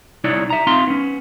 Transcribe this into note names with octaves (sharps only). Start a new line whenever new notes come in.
C2 D#4 E4 C#5 D5
E5 A#5
C4 D#4 F4 E5 C6
B3 C#4